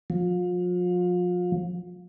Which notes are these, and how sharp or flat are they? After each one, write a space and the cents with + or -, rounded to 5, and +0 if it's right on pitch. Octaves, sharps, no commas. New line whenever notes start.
F3 +35